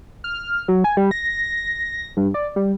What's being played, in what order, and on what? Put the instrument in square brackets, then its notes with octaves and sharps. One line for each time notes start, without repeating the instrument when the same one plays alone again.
[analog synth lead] F6
F#3
G#5
G3
A#6
G2
D5
G3